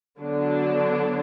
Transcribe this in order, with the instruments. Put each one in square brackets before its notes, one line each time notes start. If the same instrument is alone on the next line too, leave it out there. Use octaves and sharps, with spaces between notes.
[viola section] D3 F#3 B3 D4